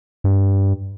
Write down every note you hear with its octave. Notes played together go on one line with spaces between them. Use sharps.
G2